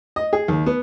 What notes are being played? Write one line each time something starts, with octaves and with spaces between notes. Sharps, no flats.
D#5
G#4
D#2
B3